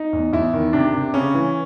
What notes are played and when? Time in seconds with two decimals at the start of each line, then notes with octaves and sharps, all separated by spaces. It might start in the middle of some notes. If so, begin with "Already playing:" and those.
Already playing: D#4
0.13 E2
0.33 E2 E4
0.54 D#3
0.73 C3 D4
0.94 C3
1.14 C#3 C#4
1.34 E3